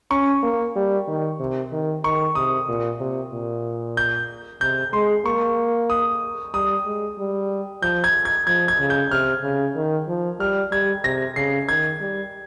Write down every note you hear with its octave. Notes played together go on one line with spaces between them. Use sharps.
C#4 C#6
A#3
G3
D#3
C3
D#3
D#3 C#6
C3 D#6
A#2
C3
A#2
G6
C3 G6
G#3 C6
A#3 C#6
D#6
G3 D#6
G#3
G3
F3 G6
G#6
G#6
F3 G#6
G#6
C#3
G6
C3 F6
C#3
D#3
F3
G3 F6
G3 G#6
C3 A#6
C#3 C7
D#3 G#6
G3